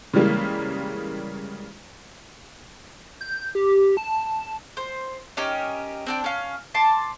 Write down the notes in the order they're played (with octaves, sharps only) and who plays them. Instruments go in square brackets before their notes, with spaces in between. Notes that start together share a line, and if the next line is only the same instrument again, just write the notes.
[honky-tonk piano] C#3 E3 G3 G#3 A#3
[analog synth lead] G6
G4
A5
[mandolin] C5
C#4 D#4 G4 A#4
C4 D4 G5
C#4 F5
A5 C6 D6